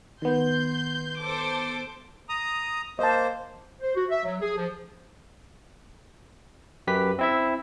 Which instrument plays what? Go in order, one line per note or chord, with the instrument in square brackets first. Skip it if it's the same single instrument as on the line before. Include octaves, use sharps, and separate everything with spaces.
[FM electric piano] D#3 B3 [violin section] C6 G6
[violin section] A4 C5 D6
[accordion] A#5 D#6
[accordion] A#3 C5 [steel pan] D#5 A5
[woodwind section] C5
F#4
E5
F#3
G#4
F3
[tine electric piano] F#2 G4 B4 B6
C4 E4 E5